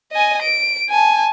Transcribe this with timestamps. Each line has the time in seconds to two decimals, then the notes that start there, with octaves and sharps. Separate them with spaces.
0.12 D#5 G#5
0.42 D7
0.90 G#5 A5